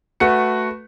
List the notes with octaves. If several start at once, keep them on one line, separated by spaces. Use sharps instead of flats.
A3 F#4 B4 C#7